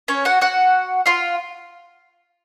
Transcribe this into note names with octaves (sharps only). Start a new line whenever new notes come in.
C#4 C#5
F#4 F#5
F#4 F#5
F4 F5